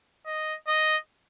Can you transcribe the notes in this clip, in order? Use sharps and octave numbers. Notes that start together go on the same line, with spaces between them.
D#5
D#5